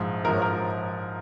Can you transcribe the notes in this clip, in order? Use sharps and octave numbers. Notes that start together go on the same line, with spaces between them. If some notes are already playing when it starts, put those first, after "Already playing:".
Already playing: A#1 G#2 F3
A#1 G#2 F3 A#4
C#5
A#4